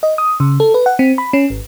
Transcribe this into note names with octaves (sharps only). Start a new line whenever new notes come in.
D#5
D#6
C#3
A4
B4
F#5
C4
B5
C#4
G#1